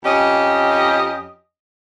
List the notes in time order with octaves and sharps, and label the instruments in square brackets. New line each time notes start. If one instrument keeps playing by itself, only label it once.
[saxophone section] F2 C#4 G4 D#5